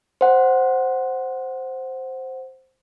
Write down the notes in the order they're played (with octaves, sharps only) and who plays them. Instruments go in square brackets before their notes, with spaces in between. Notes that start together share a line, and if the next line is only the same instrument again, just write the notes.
[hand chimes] C5 F#5